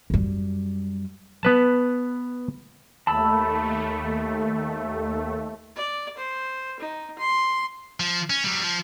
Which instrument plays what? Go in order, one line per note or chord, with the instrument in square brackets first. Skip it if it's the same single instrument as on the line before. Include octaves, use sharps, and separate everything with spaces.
[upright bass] F#2 G3
[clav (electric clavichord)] B3 B4 A5
[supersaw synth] D#2 A3 [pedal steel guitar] A5 B5 E6
[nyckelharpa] D5
C5
D#4
C6
[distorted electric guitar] F3
C#4
F#3 G3
F3